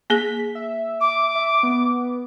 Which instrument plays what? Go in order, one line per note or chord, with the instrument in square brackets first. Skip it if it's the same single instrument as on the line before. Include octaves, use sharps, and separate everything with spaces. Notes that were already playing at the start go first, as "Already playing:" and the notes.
[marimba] A#3 G#4 A#6 [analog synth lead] B6
[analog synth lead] E5
[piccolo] D6
[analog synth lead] E5
B3